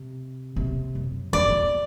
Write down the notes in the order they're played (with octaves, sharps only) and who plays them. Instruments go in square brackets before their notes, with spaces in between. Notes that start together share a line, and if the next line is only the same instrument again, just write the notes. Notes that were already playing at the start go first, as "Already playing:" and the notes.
Already playing: [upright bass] C3
C3
F#2
[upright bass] F2 [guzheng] D5
[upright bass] E2